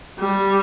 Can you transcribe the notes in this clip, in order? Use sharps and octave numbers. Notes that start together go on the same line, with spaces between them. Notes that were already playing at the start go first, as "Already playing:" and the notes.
G3